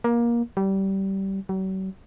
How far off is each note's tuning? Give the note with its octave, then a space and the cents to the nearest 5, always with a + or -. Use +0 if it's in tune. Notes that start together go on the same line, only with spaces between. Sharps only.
A#3 +20
G3 -20
F#3 +45